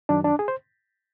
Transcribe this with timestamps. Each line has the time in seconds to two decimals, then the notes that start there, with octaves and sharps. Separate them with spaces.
0.09 F#2 D#3 F#3 D4
0.24 D4
0.39 G#4
0.48 C5